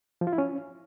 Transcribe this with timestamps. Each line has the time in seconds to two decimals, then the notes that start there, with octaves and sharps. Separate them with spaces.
0.21 F3
0.27 F4
0.33 E4
0.38 C#4